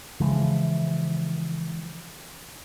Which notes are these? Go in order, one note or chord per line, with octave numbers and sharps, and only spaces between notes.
C#3 E3 F3 G#3